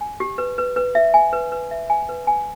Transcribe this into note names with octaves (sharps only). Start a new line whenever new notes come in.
G#5
G4
B4
B4
B4
E5
G#5
B4
B4
E5
G#5
B4
G#5